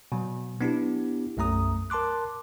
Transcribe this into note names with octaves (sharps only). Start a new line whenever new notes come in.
B2 F#3
B3 D4 E4 G4
B1 F#2 A3 A#5 D#6
A#4 A5 C6 D6 F#6